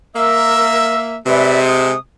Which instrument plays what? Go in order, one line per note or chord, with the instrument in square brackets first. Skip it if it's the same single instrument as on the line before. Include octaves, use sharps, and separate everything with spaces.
[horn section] A#3 E5 [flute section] A#4 E6
[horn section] C3 G#3 [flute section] B4 D5 E5
[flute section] D#6